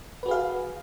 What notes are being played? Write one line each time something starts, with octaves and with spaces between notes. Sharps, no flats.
F#4 G#4 B4 F5